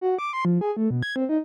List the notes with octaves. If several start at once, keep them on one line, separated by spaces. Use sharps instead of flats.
F#4
D6
C6
F3
G#4
A3
B2
G#6
C4
D#4